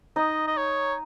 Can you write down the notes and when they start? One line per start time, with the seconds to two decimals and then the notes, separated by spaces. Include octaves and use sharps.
0.16 D#4 D#5
0.47 D#5
0.57 C#5